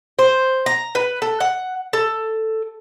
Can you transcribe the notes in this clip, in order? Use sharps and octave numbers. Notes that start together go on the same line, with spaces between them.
C5
A#5
B4
A4
F#5
A4